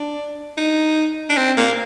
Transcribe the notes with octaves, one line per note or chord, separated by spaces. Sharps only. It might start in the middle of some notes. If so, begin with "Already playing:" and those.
Already playing: D4
D#4
D4
C4
A#3